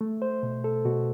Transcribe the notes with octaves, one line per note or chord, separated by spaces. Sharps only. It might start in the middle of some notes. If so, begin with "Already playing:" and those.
A3
C5
B2
A4
B2 F#4